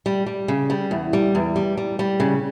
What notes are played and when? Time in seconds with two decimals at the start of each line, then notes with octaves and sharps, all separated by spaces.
0.06 G3
0.26 G3
0.48 C#3
0.70 G3
0.91 E2
1.13 G3
1.35 E2
1.56 G3
1.77 G3
1.99 G3
2.20 C#3